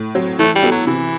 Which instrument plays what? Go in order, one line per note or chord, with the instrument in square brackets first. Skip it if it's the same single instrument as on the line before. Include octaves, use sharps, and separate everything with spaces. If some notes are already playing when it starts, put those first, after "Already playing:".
Already playing: [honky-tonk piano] A2
F#3 C4
[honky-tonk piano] E3 [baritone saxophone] A3
[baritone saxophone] G3
[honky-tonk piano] B3 F#4 A4
[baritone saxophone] F#3
[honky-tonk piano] C3 [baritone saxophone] E3